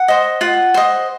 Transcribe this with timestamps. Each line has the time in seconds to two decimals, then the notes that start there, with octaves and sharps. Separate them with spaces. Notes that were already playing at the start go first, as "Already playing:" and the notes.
Already playing: F#5
0.08 C5 D#5
0.41 F4 F#5
0.74 C5 D#5